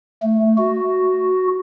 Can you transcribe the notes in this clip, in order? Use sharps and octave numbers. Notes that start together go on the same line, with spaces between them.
A3
F#4